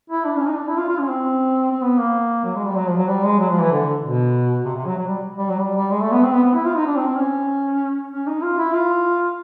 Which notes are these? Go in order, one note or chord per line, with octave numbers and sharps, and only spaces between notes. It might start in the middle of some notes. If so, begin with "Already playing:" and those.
E4
D4
C#4
D#4
D4
E4
F4
F4
C#4
C4
C4
B3
A#3
F#3
G#3
G3
F#3
F3
F#3
G3
G#3
F#3
F3
E3
D3
B2
C3
C3
F#3
F#3
G3
G3
F#3
G3
G3
G#3
A3
B3
C4
B3
B3
E4
F4
D#4
D4
C4
C4
C#4
C#4
D#4
F4
E4
F4